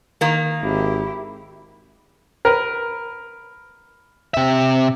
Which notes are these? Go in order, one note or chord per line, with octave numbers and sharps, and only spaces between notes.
D#3 A#3
G#1 E4 G4
A#4 B4
C3 E5